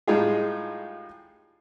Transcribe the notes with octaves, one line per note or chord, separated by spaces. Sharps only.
A2 G3 G#3 D#4 F4 G#4